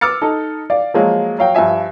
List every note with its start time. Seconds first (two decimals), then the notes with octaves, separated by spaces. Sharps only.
0.01 D6 E6 F6 A6 C#7
0.22 D#4 A4
0.70 D5 F5
0.94 F3 F#3 G#3 A#3
1.39 F#3 F5 G5
1.55 G2 F3 E5 G#5